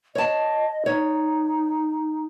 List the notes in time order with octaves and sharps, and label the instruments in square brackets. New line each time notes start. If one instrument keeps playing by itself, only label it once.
[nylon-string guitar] C#5 A5 [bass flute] D#5
[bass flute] D#4 [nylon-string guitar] C#5